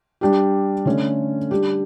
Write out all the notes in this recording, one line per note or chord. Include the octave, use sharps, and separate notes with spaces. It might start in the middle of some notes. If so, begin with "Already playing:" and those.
G3 D4 G4
D3 A3 C#4
G3 D4 G4